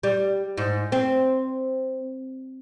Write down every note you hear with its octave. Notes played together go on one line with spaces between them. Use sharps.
G3
G#2
C4